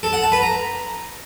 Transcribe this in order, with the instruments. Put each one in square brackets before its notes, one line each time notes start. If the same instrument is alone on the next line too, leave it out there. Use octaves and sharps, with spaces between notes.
[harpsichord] A4
F#5
A5
B4
A#5